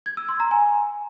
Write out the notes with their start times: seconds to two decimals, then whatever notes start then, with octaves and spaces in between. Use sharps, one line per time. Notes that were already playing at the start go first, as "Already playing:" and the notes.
0.06 G#6
0.17 E6
0.29 C6
0.40 A#5
0.51 G#5